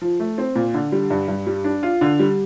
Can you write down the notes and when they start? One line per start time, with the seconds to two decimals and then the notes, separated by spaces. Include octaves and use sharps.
0.01 F3
0.20 A3
0.38 C4
0.56 A#2
0.74 D3
0.92 G3
1.10 G2
1.28 G2
1.47 G3
1.64 D4
1.83 F4
2.01 D3
2.19 G3